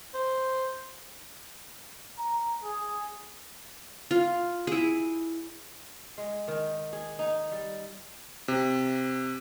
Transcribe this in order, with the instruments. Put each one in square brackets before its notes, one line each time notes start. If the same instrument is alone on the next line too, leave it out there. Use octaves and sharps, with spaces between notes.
[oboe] C5
[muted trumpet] A#5
G#4
[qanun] F4
E4 G#4
[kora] G#3
D#3
G#4
D#4
G3
[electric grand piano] C3